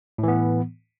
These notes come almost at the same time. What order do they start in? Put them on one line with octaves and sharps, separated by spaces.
A2 E3 B3